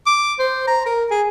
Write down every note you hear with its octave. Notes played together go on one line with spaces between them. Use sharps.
D6
C5
A#5
A#4
G#4